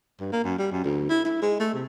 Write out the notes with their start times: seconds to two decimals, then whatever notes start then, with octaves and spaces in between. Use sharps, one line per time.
0.20 G2
0.33 A#3
0.44 F#2
0.59 G3
0.72 F#2
0.84 D2
1.10 E4
1.25 E4
1.42 G#3
1.60 A3
1.74 C3